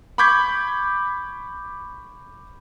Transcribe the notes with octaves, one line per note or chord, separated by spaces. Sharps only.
B5 C#6 D6 G6 G#6 B6